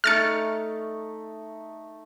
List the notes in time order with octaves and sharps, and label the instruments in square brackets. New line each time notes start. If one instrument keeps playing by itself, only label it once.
[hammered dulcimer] A3 D#4 [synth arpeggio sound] F6 A6 C#7